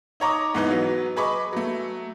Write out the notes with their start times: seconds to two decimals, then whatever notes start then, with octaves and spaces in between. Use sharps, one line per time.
0.20 D#4 C#5 A#5 D6 D#6
0.55 G#2 E3 B3 D#4
0.71 F#3 B3
1.16 G#4 B4 D#5 B5 C#6 D6
1.53 F#3 A3